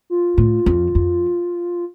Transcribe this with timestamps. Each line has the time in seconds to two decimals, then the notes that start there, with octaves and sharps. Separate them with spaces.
0.10 F4
0.38 A2
0.66 F2
0.95 F2